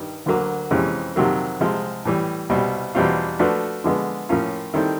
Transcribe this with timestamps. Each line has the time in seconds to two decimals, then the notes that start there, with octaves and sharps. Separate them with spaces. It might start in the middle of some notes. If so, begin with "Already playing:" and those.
Already playing: G2 D#3 G3
0.26 D2 D3 F#3 A#3
0.71 F2 C3 E3 G#3 C#4
1.16 F2 C3 D#3 F#3 A#3
1.60 C2 C3 F3 G#3
2.05 A2 E3 G3
2.50 C2 B2 G3
2.95 E2 B2 G3 C4 F4
3.39 F3 A3 D4 F#4 B4
3.84 D3 F3 G#3 B3
4.29 A2 F3 A#3 C#4 F4
4.74 D#3 G3 C4 E4 A4